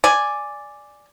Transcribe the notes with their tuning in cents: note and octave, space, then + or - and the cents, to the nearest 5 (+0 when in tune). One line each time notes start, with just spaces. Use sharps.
D5 +0 G#5 +0